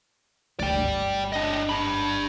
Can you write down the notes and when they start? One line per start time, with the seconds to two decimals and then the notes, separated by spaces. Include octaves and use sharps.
0.60 D2 A3 D5 G5
0.81 G1
1.33 D4 D#5
1.69 D4 B5